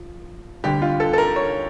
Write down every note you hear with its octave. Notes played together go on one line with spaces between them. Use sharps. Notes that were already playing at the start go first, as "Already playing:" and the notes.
Already playing: F3
D2 D3 G3 G4
F4
A4
A4
A#4
C#5